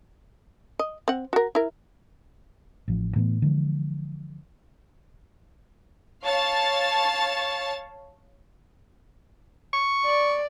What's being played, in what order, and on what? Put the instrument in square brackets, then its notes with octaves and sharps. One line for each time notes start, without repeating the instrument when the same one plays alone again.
[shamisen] D#5
C4 F#5
F#4 A#4
E4 A#4
[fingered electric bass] A1 F3
A2 E3 A3 B3
D3 E3 F3 G#3
[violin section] C#5 F5 A5 A6
[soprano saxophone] C#6
[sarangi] D5